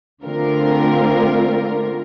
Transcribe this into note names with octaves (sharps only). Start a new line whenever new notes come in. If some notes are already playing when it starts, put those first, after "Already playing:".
D3 A3 C4 F4 A#4